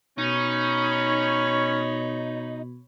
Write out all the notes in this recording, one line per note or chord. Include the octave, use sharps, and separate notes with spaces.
B2 C#4 D#4 C#5 B5